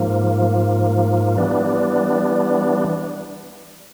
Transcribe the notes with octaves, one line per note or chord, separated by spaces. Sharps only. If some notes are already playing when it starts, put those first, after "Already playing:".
Already playing: G#2 F3 A#3
E3 G3 B3 D4